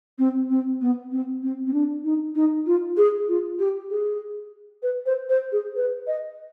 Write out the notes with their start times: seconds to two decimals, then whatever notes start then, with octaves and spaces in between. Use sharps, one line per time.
0.19 C4
0.50 C4
0.81 B3
1.12 C4
1.43 C4
1.66 C4
1.73 D4
2.04 D#4
2.35 D#4
2.66 F4
2.97 G#4
3.28 F4
3.59 G4
3.90 G#4
4.83 B4
5.06 C5
5.29 C5
5.52 G#4
5.76 B4
6.07 D#5